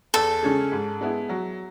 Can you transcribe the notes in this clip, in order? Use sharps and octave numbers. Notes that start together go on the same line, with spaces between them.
E2 A4
C#3 G#3 C#4 G#4
G#2
G#3 B3 E4
F#3